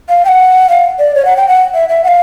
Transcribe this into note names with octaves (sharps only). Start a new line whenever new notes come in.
F5
G5
F#5
F5
D5
C#5
F#5
G5
F#5
E5
E5
F#5
F5